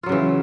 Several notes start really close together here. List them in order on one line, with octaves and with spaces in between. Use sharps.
F4 F#3 C#3 E3